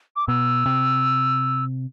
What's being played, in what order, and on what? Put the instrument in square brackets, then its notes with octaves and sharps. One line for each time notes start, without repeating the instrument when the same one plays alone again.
[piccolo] D6
[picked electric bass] B2 [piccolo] E6
[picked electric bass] C3